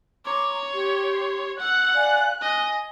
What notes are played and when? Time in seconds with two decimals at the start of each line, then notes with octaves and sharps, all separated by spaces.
0.25 C#5 A#5 C6 D6
0.73 G4 C6
1.59 F#5 E6 F#6
1.94 D5 F5 G#5
2.41 D#5 G#5